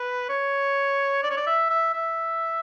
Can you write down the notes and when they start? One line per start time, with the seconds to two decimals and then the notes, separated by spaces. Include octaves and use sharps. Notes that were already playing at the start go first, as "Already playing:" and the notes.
Already playing: B4
0.29 C#5
1.23 D5
1.30 C#5
1.37 D5
1.47 E5
1.70 E5
1.94 E5